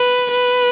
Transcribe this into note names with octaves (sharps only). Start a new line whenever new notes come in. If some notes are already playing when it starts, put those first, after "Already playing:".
Already playing: B4
B4